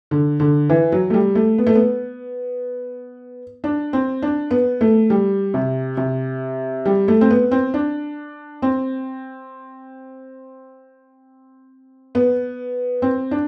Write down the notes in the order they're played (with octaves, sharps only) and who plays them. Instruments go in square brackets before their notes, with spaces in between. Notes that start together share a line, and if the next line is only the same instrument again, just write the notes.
[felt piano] D3
D3
E3
F#3
A3
G3
A3
B3
A3
B3
D4
C4
D4
B3
A3
G3
C3
C3
G3
A3
C4
B3
C4
D4
C4
B3
C4
D4